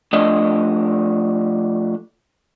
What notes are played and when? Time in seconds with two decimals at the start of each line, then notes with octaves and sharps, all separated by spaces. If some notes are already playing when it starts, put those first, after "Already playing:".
0.13 F3 A3 D4 D5 D#5